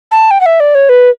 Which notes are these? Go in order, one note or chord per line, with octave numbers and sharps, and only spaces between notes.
A5
G5
F#5
E5
D5
C#5
B4